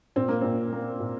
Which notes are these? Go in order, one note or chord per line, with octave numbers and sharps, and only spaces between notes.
A#2 C4
A#3
A#2 C4
A#3
A#2